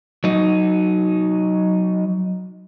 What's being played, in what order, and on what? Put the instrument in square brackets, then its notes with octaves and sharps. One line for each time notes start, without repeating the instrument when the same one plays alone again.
[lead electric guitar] F#3 D#4